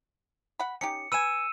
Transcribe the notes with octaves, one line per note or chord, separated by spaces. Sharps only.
F#5 B5
C#4 D#4 G4 C#7
B4 G#5 E6 D#7 E7